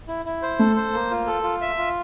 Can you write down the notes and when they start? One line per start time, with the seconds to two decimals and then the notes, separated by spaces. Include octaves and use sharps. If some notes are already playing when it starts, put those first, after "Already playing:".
0.08 E4
0.25 E4
0.42 C5
0.59 A3 A4
0.76 C5
0.93 A#3
1.11 F4
1.27 A4
1.43 F4
1.61 E5
1.78 F4